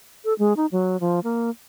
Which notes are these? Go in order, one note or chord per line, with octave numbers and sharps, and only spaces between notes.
A4
G#3
D#4
F#3
F3
A#3